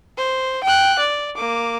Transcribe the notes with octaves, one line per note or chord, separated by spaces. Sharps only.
C5
G5 F#6
D5
A#3 D6